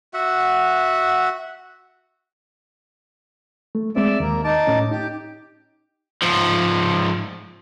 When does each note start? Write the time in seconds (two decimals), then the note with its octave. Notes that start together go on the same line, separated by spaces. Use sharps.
0.14 F#4 E5 F#5
3.75 A3
3.96 G#3 C4 D5 E5
4.20 D#2 A#3
4.44 D#4 A5 D6
4.67 A2 C#4
4.91 D#4 G4
6.22 G#2 F3